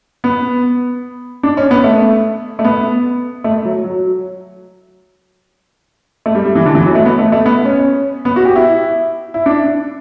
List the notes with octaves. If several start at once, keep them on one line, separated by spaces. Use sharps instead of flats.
B3
D4
C#4
B3
A3
A3
B3
A3
F#3
F#3
A3
G3
G3
E3
D3
E3
F#3
A3
B3
A3
A3
B3
C#4
B3
F#4
G4
E4
E4
D4